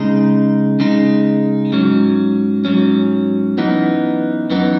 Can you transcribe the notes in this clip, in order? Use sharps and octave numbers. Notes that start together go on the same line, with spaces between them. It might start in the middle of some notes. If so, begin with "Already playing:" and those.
Already playing: C#3 G#3 D#4
C#3 G#3 D#4
G#2 F#3 C#4
G#2 F#3 C#4
F#2 E3 B3 D#4
F#2 E3 B3 D#4